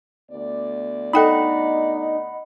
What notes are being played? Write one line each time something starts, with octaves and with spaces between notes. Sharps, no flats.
D2 B3 D5
D#4 A4 D#5 F#5 G5 B5 D#6